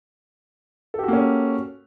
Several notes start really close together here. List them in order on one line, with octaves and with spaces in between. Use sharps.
A4 G4 F#4 A#3 C#4